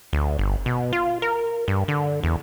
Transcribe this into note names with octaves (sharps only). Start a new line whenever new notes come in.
D2
G1
B2
F4
A#4
G2
D3
E2